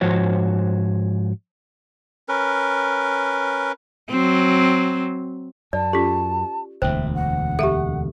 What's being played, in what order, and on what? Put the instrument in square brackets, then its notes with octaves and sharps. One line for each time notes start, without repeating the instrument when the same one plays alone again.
[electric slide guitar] G#2 F3 F#4 C5 C#5
[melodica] C#4 A#4 B4
[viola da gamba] F#3 C4
[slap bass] F#2 [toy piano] D5 [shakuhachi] A5
[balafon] C#4 F4 A4 [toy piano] G4
[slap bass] E1 D2 [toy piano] C5 [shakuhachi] E5 [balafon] G5
[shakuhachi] F#5
[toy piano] G4 A4 [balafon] E5 F5